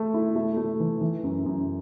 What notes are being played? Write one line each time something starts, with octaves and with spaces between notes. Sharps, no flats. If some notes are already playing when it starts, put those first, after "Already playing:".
Already playing: A3 A4
E4
A3
A3
E3
E3
F#2
F#2